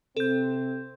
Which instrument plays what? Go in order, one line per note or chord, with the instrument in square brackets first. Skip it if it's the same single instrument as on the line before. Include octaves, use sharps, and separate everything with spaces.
[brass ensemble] C3 C4 [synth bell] A4 G6